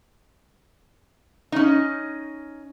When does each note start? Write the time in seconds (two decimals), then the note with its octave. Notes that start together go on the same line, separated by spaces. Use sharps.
1.52 C#4 D#4